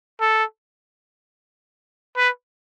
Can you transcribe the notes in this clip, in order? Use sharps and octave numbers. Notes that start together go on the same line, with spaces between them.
A4
B4